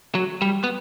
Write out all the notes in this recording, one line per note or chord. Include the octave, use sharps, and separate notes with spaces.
F#3
G3
B3